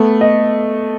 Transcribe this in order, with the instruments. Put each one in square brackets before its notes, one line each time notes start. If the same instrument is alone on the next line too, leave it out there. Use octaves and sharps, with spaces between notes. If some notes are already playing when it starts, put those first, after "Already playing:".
Already playing: [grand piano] A3 [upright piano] B3
[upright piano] D#5